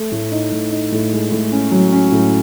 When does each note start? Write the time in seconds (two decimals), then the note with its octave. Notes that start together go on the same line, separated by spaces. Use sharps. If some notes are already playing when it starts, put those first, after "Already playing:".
Already playing: A3
0.12 A2
0.32 D#4
0.52 A2
0.72 D#4
0.92 A2
1.12 G#3
1.32 A2
1.52 C#4
1.72 F#3
1.92 C#4
2.12 A2